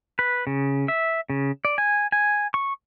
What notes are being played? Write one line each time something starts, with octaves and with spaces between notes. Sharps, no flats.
B4
C#3
E5
C#3
D5
G#5
G#5
C#6